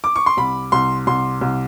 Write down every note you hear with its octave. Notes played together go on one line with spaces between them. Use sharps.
D6
C#6
C6
C2 B5
C2 C6
C2 C6
C2